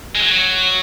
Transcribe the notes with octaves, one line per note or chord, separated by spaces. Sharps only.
G#3
F#3